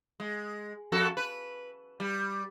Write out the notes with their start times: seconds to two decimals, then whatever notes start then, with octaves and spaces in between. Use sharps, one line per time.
0.20 G#3
0.92 F2 F#4 A4
1.17 B4
2.00 G3